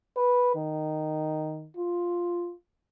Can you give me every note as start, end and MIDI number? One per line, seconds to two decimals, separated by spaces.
0.17 0.55 71
0.56 1.68 51
1.77 2.53 65